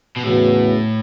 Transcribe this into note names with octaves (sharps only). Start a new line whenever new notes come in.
B2
E2 A2 C#3 E3 B3 F#4